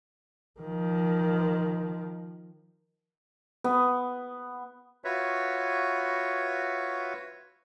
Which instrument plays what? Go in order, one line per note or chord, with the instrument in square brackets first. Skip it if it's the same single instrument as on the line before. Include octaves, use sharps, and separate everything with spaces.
[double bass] D#3 F3
[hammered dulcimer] B3
[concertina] F4 F#4 B4 C#5 E5